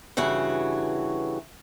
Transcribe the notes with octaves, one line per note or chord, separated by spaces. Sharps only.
G2 C#3 E3 F#4